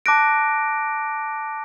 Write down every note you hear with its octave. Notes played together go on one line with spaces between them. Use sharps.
A5 D6 F#6 A#6 D7